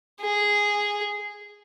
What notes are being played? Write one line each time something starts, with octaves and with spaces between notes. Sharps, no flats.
G#4